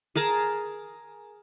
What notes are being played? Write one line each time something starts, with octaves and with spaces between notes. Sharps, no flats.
G#4 A#4 A5 A#5